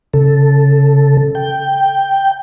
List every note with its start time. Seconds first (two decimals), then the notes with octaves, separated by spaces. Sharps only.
0.13 C#3 A4
1.35 G5